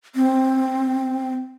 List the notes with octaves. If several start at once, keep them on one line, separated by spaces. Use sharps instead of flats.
C4